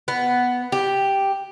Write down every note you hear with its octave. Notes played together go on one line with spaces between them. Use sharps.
B3
G4